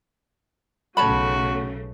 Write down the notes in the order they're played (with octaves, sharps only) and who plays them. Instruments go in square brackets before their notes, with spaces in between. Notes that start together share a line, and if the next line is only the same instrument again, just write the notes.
[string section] B1 C#3 A3 [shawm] F#4 [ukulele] C#5 A5 B5